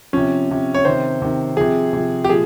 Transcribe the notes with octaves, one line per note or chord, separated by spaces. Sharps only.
C3 F3 C#4
C3 F3
C#5
C3 D#3 C5
C3 D#3
C3 F3 G#4
C3 F3
G4
A#2 F3 G#4